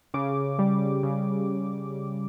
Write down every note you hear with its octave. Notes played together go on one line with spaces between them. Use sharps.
C#3 D6
G3
C#3